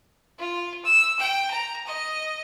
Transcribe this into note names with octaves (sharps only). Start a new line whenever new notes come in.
F4
E6
G5
A#5
D#5